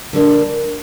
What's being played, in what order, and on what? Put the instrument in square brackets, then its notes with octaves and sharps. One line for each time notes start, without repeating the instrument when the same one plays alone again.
[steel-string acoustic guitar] D3 G3 A#3 D4